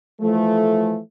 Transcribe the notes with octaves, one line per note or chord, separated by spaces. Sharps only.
E3 F3 A3